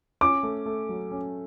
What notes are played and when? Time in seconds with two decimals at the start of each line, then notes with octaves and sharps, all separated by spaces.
0.21 C#4 D6
0.43 A3
0.66 A3
0.89 F#3
1.11 C#4